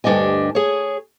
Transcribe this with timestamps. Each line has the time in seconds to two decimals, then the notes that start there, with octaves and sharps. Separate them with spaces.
0.04 D2 G2 D4 G4 D#5 G#5
0.55 G#4 C#5